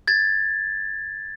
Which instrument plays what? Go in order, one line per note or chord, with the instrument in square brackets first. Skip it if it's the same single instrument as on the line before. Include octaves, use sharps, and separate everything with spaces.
[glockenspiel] G#6 A6